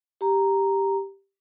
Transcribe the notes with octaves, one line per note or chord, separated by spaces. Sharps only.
G4 A#5